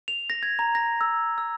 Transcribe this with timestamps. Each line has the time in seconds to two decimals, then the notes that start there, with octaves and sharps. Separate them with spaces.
0.08 F7
0.30 A#6
0.43 G#6
0.59 A#5
0.75 A#6
1.01 E6
1.38 E6